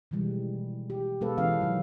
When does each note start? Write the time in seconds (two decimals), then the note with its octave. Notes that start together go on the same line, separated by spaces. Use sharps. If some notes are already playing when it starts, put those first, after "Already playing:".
0.11 B2 D#3 E3 G3 G#3
0.90 G4
1.21 B2 G#3 B3 A4 B4 F5
1.37 E3 C#4 F5
1.61 D#3 F#3